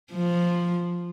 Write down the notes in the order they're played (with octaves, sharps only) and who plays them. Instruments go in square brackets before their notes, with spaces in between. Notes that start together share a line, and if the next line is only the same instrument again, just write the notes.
[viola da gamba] F3